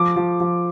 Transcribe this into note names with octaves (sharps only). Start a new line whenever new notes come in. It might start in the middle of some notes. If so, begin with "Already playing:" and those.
Already playing: F3 D6
F3
F3